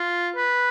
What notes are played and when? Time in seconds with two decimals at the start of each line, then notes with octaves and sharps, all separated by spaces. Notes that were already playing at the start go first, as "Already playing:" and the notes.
Already playing: F4
0.36 B4